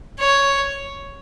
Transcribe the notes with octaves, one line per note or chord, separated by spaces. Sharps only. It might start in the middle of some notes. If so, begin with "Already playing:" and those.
C#5